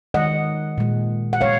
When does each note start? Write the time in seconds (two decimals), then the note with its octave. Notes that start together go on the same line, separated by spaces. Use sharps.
0.14 D#3 G#3 D#5 F#5
0.78 A#2 G#3
1.33 F#5
1.41 A#2 G#3 C#5 F5